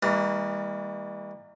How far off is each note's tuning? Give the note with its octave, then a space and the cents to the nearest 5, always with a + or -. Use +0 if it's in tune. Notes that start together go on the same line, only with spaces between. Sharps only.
E3 -25 G3 +40 A#3 -15